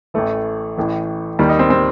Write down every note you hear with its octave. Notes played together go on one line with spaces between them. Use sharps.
A1 A2 E3 A3
A1 A2 E3
D#2 D#3 G3
D#4
C4
C4